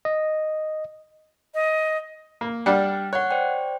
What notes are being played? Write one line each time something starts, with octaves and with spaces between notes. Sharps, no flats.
D#5
D#5
A#3
G3 D4 F#5 G5 F6
C#5 F#5 F#6
C5 D5 G5